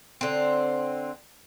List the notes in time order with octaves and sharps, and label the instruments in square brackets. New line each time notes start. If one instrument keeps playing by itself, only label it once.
[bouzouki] D3 C4